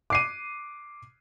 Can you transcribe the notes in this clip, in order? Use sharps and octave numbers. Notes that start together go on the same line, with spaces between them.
D6 C7 D#7